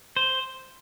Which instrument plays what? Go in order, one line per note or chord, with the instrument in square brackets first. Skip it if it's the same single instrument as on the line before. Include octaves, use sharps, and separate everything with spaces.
[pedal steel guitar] C5